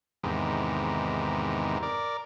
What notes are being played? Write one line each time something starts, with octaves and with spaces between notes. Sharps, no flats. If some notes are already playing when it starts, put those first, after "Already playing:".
E2 G#2 C3 D#3
A#4 D5